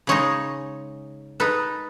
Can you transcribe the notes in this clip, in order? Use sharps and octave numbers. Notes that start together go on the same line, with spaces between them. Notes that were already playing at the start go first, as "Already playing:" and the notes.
C#3 G#3 D#4 C#5
G#3 D#4 A4 B4